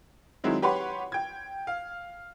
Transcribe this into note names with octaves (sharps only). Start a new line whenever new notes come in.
D#3 F#3 G#3 C4 E4
G4 B4 C#5 F#5 C6
G5 G#6
F5